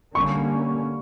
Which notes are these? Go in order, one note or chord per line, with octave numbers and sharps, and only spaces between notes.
D3 G3 A#3 C#4 C#6